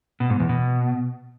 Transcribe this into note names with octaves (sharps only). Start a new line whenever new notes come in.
B2
G#2
E2
B2